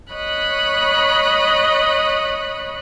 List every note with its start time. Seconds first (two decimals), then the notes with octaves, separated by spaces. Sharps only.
0.13 C#5 D#5 B5 F#6